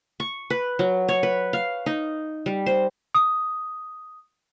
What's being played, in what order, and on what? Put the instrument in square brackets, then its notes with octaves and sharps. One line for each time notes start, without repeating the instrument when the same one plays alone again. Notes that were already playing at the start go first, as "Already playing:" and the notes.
[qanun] C#6
B4
F#3
C#5
B4
F5
D#4
G3
C5
[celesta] D#6